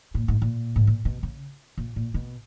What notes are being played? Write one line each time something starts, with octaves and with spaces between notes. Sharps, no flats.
A#2
G#2
A#2
G#2
A#2
B2
C#3
A#2
A#2
B2